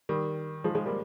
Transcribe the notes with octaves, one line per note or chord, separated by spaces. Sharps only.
D#3 G3
F3 G#3
F3 G#3
G3 A#3